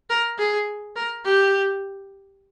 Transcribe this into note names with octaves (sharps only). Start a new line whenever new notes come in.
A#4
G#4
A#4
G4